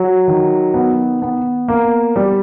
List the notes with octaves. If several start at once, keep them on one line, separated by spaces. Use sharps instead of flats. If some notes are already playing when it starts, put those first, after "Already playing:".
Already playing: F#3
D#3
B3
B3
A#3
G3